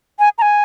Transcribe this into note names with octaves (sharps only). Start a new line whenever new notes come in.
G#5
A#5
G#5